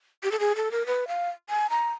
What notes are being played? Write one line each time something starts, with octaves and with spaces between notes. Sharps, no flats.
G4
A4
G#4
A4
A#4
B4
F5
G#5
A#5